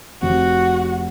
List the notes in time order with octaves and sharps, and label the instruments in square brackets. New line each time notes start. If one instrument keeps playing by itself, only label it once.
[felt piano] F1 [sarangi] F#4